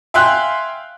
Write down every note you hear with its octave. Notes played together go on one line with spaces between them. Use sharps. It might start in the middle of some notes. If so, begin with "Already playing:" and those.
E5 F5 G5 G#5 C6 F#6